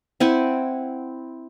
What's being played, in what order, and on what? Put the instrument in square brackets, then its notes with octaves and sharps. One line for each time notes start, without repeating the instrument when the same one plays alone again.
[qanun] C4 E4 F#5 G#5